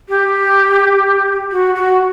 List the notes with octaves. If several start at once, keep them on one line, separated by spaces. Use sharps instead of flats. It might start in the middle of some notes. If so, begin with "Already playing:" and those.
G4
F#4
F#4